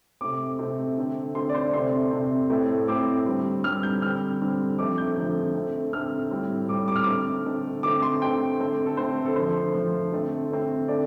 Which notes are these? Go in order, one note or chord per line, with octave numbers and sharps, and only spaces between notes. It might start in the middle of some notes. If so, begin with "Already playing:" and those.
C3 A3 C4 D6
C3 A3 C4
D3 A3 C4
D3 A3 C4 C6
D5
C5
C3 A3 C4 C6
C3 A3 C4
A2 A3 C4
A2 A3 C4 D6
D3 G3 C4
D3 G3 C4 F6
G6
D3 G3 C4 F6
D3 G3 C4
D3 F3 A3 C4 D6
G6
D3 F3 A3 C4
D3 A3 C4
D3 A3 C4 F6
A2 G3 C4
A2 G3 C4 D6
D6
F6
D3 A3 C4 D6
D3 A3 C4
D3 A3 C4 D6
C6
D3 A3 C4 G5
D3 A3 C4
A4
D3 A3 C4 C5
A4
D3 F3 A3 C5
D3 F3 A3
D3 A3 C4
D3 A3 C4
D3 A3 C4 D5